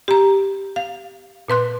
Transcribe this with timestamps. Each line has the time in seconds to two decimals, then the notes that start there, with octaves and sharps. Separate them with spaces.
0.08 G4 A#5
0.76 F5
1.48 A#2 B4 C6 F#6